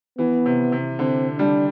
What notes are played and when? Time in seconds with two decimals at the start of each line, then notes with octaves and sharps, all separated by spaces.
0.18 E3 B3
0.46 C3
0.72 C3
0.99 D3 C4
1.39 G3 D4